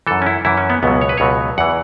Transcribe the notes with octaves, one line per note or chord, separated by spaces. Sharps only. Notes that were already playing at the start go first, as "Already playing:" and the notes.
F#2 E3 A4
C#4
E4
F#2 E3 E4
C#4
B3
C#2 B2 F#3 B3
C#5
B4
C#2 B2 F#3 C#5
E2 E3 F#5